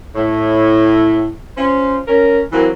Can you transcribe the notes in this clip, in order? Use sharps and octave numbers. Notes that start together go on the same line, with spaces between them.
A2
C#4 F4 C5
C#4 A#4
E3 F#3 A#3 C4